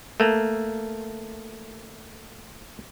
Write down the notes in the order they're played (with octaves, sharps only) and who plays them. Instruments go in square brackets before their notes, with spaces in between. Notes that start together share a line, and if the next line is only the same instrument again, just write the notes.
[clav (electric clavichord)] A3 A#3